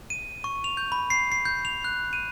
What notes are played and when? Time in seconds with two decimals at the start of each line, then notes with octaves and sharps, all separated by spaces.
0.10 D#7
0.44 C#6
0.64 F7
0.77 G6
0.92 B5
1.10 C7
1.32 C7
1.45 G6
1.65 F7
1.84 F#6
2.13 D#7